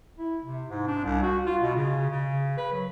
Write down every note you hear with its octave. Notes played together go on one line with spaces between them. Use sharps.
E4
C3
G#2
D4
C2
F#4
F4
B2
C#3
C#3
B4
F#3